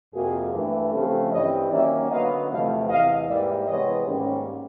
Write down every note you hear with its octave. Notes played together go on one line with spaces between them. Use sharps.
F2 C3 F3 A#3 F#4 G#4
G2 E3 A3 D4
C#3 F3 A3 C4 G4 A4
G2 E3 G3 C4 C#5 D#5
D#3 F#3 A#3 C#4 D5 E5
D3 F#3 B3 D#5 F5
E2 C3 F3 A3 D#5 F5
E2 C3 E3 D#5 F5
G#2 E3 G3 A#3 D5 E5
C3 E3 G#3 B3 C#5 D#5
G#2 D#3 G3 A#3 C#4